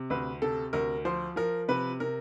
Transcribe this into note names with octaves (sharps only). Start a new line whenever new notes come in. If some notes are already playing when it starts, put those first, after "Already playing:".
Already playing: C3
D2 B4
C3 A4
D2 A#4
F3 C5
F3 A#4
C3 B4
C3 A#4